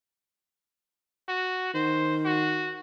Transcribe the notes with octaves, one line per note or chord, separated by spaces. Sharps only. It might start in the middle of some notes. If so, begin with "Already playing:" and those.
F#4
D#3 C5
F#4